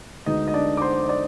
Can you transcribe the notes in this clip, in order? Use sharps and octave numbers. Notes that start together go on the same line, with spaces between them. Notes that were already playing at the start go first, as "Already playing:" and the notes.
D2 D3 G#3 B3 D#4 D#5
D#5
D4 D5
D6
C5 C6
D5 D6